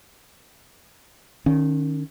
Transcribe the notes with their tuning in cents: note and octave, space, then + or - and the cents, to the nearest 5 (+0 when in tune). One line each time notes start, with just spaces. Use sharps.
D#3 -20 C#4 +0